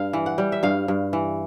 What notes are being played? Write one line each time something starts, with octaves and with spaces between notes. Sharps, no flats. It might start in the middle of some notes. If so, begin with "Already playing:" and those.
Already playing: G2 F5
E3
F#5
G3
E5
G2 F5
G2
E3